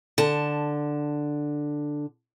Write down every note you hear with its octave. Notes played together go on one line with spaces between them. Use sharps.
D3 A5